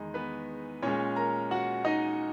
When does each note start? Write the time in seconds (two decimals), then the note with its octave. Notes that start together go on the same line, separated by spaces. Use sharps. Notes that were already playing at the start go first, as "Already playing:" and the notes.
Already playing: E2 D#3 G#3 D#4
0.14 B3 B4
0.82 A#2 G#3 C#4 C#5
1.16 A#4 A#5
1.51 F#4 F#5
1.84 D#4 D#5